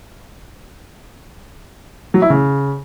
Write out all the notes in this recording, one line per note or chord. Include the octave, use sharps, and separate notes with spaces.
F#3
E4
C#3